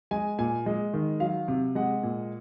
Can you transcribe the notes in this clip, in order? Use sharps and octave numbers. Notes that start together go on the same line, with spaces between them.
G#3 G#5
A#2 G#5
G#3
D#3
F#3 F5
C3
G#3 F#5
A#2